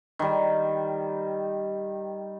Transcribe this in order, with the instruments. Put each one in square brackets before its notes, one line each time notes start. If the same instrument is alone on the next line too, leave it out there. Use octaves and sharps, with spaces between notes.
[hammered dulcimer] D#3 G3